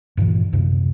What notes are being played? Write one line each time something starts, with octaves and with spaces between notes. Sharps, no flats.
G2 A#2 C#3 E3
C#2 F#2 C3